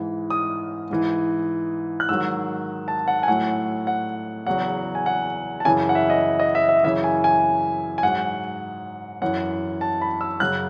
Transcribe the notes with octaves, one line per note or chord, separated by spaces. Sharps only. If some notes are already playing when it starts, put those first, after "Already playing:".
Already playing: G#2 E3
D#6
G#2 E3
F#6
G#2 D#3 F#3 E6
A5
F#5
G#5
A2 F#3 F#5
F#5
E2 C#3 F#3 F#5
G#5
F#5
A5
F#2 C#3 E3 G#5
F#5
E5
D#5
D#5
E5
E5
F#2 C#3 E3 E5
G#5
G#5
G#5
G#2 F#3 F#5
F#2 E3 F#5
A5
B5
E6
F#2 C#3 F#3 F#6